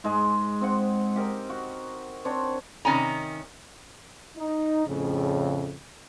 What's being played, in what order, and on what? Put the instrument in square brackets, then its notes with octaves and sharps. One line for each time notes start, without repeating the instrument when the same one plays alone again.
[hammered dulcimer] G#2 G#3 D#5
C4 F#5
G4 A#4 D#5
F#4
C4 D4 C#5
[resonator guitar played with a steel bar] C3 D#3 C#4 G#5 A#5
[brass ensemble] D#4
F2 A2 C#3